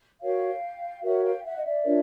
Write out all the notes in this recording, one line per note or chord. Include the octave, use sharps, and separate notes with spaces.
F#4 A#4 C#5 F5 G5
F#4 A#4 C#5 E5 F#5
F5 G5
E5 F#5
D#5
D5 E5
D4 F4 A#4 C#5